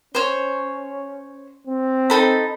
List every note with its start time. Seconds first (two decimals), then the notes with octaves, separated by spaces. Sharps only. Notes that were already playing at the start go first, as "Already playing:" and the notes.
0.15 C#4 C5 C#5
1.67 C4
2.10 D#4 A4 B5